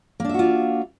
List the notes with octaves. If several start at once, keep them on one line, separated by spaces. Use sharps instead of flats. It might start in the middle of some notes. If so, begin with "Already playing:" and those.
A#3 D4 F4 F#4 E5